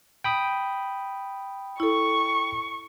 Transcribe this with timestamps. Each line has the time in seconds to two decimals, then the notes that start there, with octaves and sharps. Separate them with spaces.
0.24 G5 B5 D#6
1.80 E4 A4 C#6